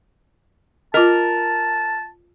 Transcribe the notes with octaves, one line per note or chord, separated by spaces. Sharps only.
F4 A#4 D#5 A5